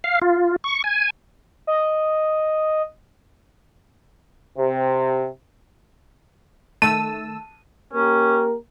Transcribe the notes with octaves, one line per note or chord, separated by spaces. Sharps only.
F5
F4
C#6
G#5
D#5
C3
D#3 A3 A5 E6 D#7
A#3 C#4 G4 A#4